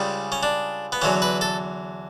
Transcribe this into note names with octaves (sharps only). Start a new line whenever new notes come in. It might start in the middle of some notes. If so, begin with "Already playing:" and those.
Already playing: C#2 C#3 G3
C#4
D4
B3
E2 D3 F#3 C#4
B4
A4